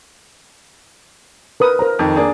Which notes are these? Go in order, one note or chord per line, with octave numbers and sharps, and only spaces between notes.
A#4 B4 D#6
A#4 C5 A#5
F2 D#3
A#3 D4 G#4